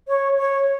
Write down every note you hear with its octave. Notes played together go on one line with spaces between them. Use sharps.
C#5
C#5